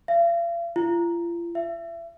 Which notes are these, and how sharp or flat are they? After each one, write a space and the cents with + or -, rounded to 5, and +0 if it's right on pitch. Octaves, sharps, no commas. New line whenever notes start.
F5 -45
F4 -40
E5 +30